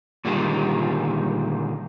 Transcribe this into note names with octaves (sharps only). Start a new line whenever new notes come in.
A#2 D3 D#3 G3 G#3